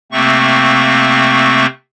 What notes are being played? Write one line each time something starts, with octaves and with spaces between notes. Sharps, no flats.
C3 A3 A#3 C4 C#6